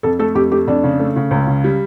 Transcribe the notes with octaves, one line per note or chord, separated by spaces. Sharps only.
F2 A4
A3 A4
F2 G4
A3 G4
F2 D4
C#3
A3
C#3
C#2
C#3
G3